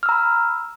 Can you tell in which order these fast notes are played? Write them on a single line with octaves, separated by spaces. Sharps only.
F6 E6 A#5 B5